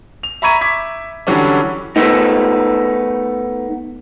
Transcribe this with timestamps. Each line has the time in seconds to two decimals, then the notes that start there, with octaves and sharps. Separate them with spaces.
0.23 F7
0.42 E5 A#5 B5 C#6 G#6 D#7
0.61 E5 D6 G#6 B6
1.27 D3 E3 F#3 G3 C#4 D4
1.96 A3 B3 D#4